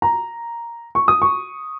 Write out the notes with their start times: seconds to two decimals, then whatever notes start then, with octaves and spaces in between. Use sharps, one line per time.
0.02 A#5
0.95 C#6
1.08 D#6
1.22 C#6